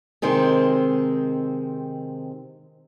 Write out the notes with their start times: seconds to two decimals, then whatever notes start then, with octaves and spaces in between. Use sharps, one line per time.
0.22 C3 D#3 G#3 C4